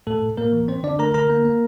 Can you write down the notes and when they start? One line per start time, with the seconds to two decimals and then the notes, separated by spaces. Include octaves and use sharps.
0.07 A2 A3 A4
0.22 A2
0.37 A2 A#3 A#4
0.53 E3
0.68 C4 C5
0.83 D3 D4 D5
0.99 A3 A#4 A#5
1.14 D3 A#4 A#5
1.30 A#3
1.45 A#3